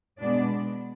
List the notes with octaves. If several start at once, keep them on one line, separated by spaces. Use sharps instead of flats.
B2 G#3 B3 D4 D5